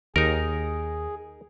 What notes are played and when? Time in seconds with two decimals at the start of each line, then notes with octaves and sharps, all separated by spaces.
0.16 D#2 D#4 G#4 A#4